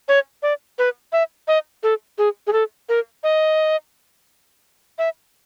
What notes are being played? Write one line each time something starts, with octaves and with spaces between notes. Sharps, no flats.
C#5
D5
B4
E5
D#5
A4
G#4
G#4
A4
A#4
D#5
E5